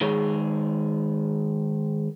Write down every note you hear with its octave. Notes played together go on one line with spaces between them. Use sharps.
D#3 G#3 G#4 C#5